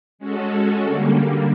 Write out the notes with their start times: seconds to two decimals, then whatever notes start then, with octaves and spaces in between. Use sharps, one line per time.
0.19 G#3 C#4 F#4 A4
0.82 D3 G3 A#3